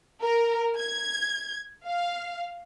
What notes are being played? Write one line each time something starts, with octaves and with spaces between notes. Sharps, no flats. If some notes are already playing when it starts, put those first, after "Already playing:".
A#4
G#6
F5